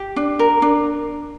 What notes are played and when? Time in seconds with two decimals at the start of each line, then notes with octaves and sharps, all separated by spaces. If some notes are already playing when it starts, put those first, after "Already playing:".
Already playing: G4
0.16 D4
0.39 A#4
0.62 D4